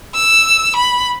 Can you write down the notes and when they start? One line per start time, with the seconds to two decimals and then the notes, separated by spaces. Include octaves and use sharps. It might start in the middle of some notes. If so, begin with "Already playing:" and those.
0.15 E6
0.76 B5